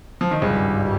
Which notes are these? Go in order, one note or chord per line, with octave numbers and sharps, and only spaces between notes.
F3
D#3
G#1 C#2 G2 C#3 G3